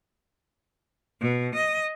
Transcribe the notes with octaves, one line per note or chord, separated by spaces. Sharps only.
B2
D#5